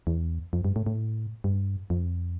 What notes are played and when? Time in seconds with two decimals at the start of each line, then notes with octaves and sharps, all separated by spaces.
0.07 E2
0.53 F2
0.65 G2
0.76 A2
0.86 A2
1.44 G2
1.90 F2